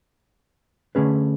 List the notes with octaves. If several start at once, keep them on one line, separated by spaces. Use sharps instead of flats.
D3 A3 C#4 G#4 B4